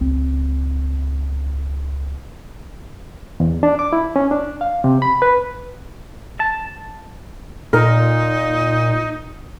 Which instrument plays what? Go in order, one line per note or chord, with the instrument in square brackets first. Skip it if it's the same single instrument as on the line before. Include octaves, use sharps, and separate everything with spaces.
[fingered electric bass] C#2 C4
[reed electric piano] E2
D4
D6
E4
C#4
D4
F5
C3
B5
B4
[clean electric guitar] A5
[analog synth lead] A#2 [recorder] D#4 [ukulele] A#4